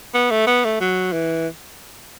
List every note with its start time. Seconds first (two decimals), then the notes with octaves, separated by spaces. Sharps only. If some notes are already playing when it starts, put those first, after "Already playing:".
0.14 B3
0.31 A3
0.47 B3
0.65 A3
0.81 F#3
1.13 E3